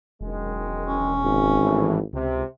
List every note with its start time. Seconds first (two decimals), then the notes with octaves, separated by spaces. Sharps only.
0.21 E1 F#2 D#3 G#3
0.86 C#4
1.24 G#1
1.62 A2 E3
2.13 C#2 C3